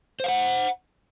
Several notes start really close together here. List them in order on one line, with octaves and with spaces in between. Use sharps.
C5 F5 F#5